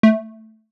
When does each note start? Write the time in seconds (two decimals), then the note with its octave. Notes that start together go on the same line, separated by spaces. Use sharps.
0.03 A3